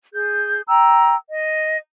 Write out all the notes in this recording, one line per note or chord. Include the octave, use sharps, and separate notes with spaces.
G#4 G6
G5 A#5 E6
D#5